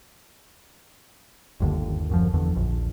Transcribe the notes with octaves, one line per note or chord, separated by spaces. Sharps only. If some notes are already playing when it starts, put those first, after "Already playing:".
G1 D#2 D3
F#2 F3
E2 D3
A#1